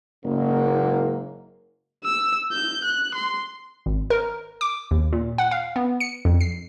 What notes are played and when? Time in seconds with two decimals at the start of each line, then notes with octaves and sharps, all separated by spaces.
0.25 F#1 G#2 F#3 A#3
2.04 E6
2.52 G6
2.84 F#6
3.15 C6
3.86 G#1
4.10 A#4
4.61 D6
4.91 D#2
5.13 A#2
5.38 F#5
5.51 F5
5.76 B3
6.00 C#7
6.25 F2
6.41 C7